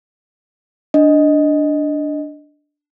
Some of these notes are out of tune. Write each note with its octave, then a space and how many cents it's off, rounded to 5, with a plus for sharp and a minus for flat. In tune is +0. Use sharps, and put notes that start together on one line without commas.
D4 +0 D#5 +0